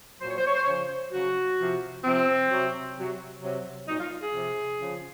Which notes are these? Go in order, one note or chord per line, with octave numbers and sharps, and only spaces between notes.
A#2 F#3 C5
C#5
C5
C#5
C5
C#5
C#3 F3 C5
C#3 F#3 F#4
C3 F3
C3 F3 C4
C3 F#3
C3 F#3
C3 F#3
A#2 F#3 D#4
F4
G#4
C3 F3
C#3 F3